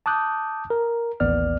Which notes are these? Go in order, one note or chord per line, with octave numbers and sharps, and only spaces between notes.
A5 D6 D#6 F#6 G6
A#4
A1 D#2 B3 D5 F6